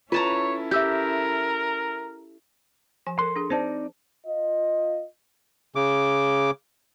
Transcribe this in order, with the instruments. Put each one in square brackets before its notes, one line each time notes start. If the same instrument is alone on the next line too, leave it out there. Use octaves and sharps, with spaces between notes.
[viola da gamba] C#4 E4 A4 [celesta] F4 [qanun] B4 A5 A#5 [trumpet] C#5
[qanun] G4 [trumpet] A#4 [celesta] E5 E6 G6
[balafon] F3 G#5
[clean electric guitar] A4 C6 [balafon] A#4
[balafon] D4 G#4
[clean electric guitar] C4 D#4 D5 [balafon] C5 A5
[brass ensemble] F4 D#5
[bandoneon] C#3 D6